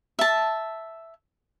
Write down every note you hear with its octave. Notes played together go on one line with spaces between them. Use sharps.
E5 A5